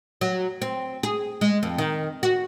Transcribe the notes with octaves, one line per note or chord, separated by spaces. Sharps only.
F#3
C4
G#4
G#3
F2
D#3
F#4